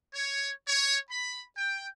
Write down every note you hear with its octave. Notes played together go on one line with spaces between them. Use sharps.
C#5
C#5
B5
G5